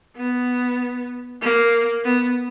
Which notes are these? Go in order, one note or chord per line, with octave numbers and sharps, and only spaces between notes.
B3
A#3
B3